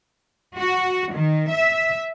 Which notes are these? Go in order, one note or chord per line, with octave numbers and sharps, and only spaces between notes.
F#4
D#3
E5